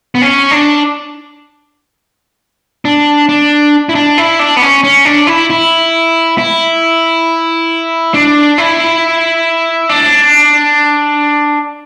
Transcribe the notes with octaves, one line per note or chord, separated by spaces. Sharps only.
B3
C#4
D4
D4
D4
E4
D4
E4
D4
B3
C#4
C#4
D4
E4
E4
E4
D4
E4
D4